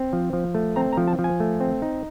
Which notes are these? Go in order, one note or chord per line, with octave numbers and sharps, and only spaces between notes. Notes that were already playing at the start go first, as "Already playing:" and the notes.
Already playing: C4
F3
F3
A3
C4 A#5
A#5
F3
A5
F3
G#5
A3
C4
D#4